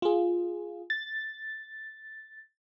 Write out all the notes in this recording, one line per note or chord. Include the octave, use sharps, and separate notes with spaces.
F4 G#4
A6